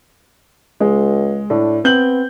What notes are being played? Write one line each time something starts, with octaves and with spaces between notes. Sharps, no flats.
C#2 G#3
A2 D4
B3 C4 G6 F#7